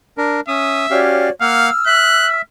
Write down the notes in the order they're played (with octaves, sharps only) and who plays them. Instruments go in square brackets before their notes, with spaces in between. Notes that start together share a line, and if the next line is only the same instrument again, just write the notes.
[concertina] D4 A#4
[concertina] C#4 D#6 [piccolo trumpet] E5
[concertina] C#4 G4 F5 [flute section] F#4 C#5 D5
[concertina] A#3 F#5 [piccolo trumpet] F5 [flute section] E6 F6
[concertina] E5 [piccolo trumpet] F#6